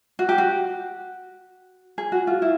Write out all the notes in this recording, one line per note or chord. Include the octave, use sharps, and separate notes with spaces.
F#4
G4
F#4
G#4
F#4
F4
E4